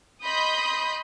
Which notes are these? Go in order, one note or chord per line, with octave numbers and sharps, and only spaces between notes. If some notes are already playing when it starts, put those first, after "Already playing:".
D#5 B5 C6 D#6 G6